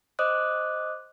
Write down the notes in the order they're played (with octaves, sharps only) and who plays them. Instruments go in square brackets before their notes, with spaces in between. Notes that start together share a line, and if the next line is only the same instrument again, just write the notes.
[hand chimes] C5 D#5 D6 D#6 F#6